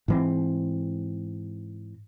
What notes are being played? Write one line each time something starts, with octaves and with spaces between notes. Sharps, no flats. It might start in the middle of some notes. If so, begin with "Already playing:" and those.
G#2 E3 C4